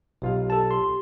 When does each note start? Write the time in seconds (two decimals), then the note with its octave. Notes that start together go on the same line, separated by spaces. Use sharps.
0.22 B1 F4 G4 F5
0.50 A4 A5
0.71 C6